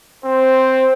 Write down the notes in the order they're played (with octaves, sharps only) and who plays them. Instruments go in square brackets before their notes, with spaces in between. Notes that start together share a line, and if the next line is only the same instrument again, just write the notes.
[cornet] C4 [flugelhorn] C5